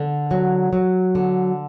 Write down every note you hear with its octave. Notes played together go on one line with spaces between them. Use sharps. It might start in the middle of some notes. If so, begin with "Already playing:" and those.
Already playing: D3
F#3
F#3
D3